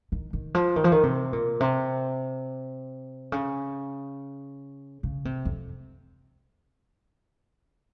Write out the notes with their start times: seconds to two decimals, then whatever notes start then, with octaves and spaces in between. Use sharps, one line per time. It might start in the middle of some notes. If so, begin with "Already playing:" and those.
0.12 D#3
0.33 D#3
0.54 F3
0.76 D#3
0.84 F3
0.92 D#3
1.03 C3
1.33 A#2
1.60 C3
3.32 C#3
5.03 C#3
5.25 C3
5.45 F2